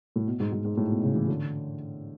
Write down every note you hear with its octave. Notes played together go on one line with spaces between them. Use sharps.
A2
B2
G#2
G#2
G#2
A2
B2
C#3
E3
D3